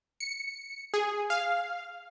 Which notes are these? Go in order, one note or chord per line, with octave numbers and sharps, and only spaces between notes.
C#7
G#4
F5